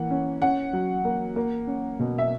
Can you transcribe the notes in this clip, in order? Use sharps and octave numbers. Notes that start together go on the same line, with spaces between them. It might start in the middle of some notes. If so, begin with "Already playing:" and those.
Already playing: E3 A#3 F#5
C#4
C#4 F#5
F#3
A#3
A#3
C#4
B2
E5